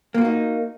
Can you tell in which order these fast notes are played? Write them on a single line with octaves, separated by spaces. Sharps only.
A#3 F4 F#4 D#4